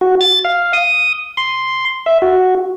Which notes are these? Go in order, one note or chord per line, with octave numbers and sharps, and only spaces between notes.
F#4
A6
F5
D#6
C6
E5
F#4